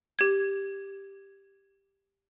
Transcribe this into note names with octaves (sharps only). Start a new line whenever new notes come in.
G4 G#6